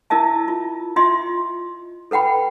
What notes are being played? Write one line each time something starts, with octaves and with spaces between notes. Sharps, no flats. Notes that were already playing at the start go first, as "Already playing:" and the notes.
E4 A#4 D#5 E5 A5
F4
F4 D#5 E5 C6
A4 B4 F#5 G5 B5